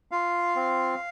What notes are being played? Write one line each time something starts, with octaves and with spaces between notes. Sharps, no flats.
F4 F5
C4